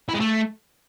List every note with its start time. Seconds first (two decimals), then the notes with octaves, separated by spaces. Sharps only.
0.09 E4
0.14 G#3
0.20 A3